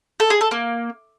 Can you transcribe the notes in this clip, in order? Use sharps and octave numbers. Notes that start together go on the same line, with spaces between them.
A4
G#4
A4
A#3